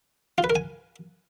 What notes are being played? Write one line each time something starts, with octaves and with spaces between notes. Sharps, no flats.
F4
B4
A#4
G#5